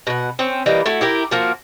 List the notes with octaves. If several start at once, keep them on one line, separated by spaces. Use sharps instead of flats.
B2 F#5
C4 C#4
E3 G3 A#3 D#5
A3 E4 F#4
E4 G4 A#4
F3 A#3 F#4